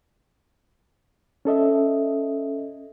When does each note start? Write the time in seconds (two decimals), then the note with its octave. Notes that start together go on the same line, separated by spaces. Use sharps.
1.45 C#4 A4 D#5 E5